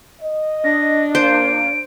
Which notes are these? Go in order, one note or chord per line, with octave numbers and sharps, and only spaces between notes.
D#5
D4 A#6
A#2 A#3 C5 D7